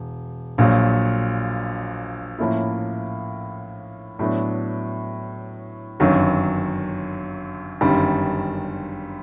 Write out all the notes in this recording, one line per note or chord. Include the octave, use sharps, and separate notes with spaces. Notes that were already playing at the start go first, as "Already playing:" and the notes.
Already playing: E1
A#1 A#2 F#3
A2 F3 A#3 C#4 E4
A2 F#3 B3 D4
G1 F#2 D#3 F#3
G1 F#2 D#3 G3